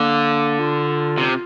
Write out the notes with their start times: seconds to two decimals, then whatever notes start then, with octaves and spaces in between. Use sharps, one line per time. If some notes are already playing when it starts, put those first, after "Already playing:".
Already playing: D3 A#3
0.59 F4
1.18 C3